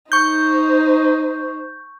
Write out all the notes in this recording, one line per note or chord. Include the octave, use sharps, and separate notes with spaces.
D#4 C5 C#6 G6